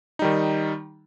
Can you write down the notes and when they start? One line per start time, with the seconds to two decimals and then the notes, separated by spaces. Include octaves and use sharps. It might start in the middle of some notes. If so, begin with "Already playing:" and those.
0.19 D#4
0.22 G3
0.24 D#3